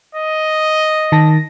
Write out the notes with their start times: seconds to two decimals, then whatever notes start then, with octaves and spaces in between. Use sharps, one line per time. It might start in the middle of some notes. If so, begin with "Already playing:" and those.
0.14 D#5
1.12 D#3 A5 A#6